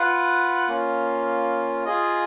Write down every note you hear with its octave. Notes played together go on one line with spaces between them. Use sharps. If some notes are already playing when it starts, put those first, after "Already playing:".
Already playing: F4 B4 F#5
A#3 C#4 F4
F4 G#4 D#5